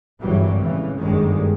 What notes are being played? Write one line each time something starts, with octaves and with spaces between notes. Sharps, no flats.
G#1 G2 E3 F#3 G3
A2 C#3 E3
G1 F#2 D#3 G3 G#3